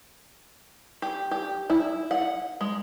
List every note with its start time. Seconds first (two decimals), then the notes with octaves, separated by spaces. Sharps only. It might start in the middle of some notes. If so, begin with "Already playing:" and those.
1.02 G4
1.31 G4
1.70 E4
2.11 F#5
2.61 G#3